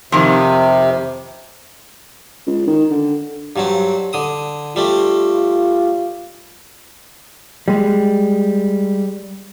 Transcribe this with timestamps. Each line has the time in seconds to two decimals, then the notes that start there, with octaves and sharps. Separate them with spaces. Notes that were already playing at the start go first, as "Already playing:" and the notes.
0.12 F2 C3 D#3
2.47 C#2
2.67 D#3
2.91 D3
3.56 G2 F#3 C4
4.13 D3 D#6
4.76 G3 A3 C4 F4
7.68 G3 G#3